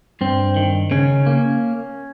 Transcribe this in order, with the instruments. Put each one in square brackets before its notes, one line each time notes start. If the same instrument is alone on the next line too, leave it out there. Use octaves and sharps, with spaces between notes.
[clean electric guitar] G2 C4
D#3
C#3 C#4
A#3